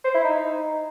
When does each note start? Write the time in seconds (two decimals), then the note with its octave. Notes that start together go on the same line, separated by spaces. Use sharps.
0.04 C5
0.14 E4
0.24 D#4